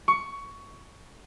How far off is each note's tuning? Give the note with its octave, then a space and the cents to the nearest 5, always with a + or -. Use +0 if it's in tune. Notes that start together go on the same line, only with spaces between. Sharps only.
C#6 +15